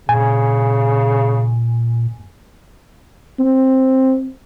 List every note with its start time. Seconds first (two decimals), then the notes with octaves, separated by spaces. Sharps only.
0.09 A#2 C#3 G#5
3.39 C4